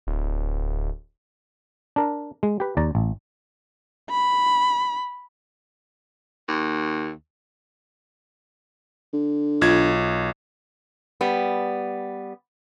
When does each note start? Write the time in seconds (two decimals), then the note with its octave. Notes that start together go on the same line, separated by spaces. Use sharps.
0.07 D1
1.96 D4 A#4
2.43 G#3
2.60 G4 B4
2.77 D#2 D5 A#5
2.95 A1
4.10 B5
6.49 D#2
9.13 D3
9.61 B1 F4 G#6
11.21 G3 B3